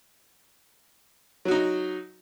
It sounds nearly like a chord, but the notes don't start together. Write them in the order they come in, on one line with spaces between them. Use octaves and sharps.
F#3 F#4 D#4